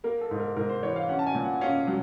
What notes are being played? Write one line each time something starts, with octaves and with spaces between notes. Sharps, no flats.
A#3 A#4
A4
G#2
A#4
G#2 A#4
C5
E3 C#5
F5
C#4 F#5
A5
G#5
A#2
F#5
C#4 F5
F#3